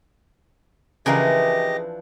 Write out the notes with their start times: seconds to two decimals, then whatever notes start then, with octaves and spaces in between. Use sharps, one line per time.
1.06 C#3 E3 F3 D4 G4 A#4 D#5